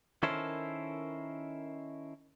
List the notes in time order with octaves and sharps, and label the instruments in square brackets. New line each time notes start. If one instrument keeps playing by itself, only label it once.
[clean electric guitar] D#3 C#4 E4 A4 A#4 C5